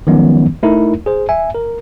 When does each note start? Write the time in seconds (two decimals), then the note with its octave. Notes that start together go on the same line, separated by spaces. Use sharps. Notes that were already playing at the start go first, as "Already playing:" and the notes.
0.07 D#3 F3 F#3 G#3 B3 C#4
0.63 A3 D#4 E4 A#4
1.06 G#4 C5
1.29 E5 G#5
1.54 A#4